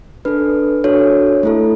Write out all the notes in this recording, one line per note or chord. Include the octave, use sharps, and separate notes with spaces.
D4 A4 B4
D4 F#4 A4 C#5
A3 E4 A4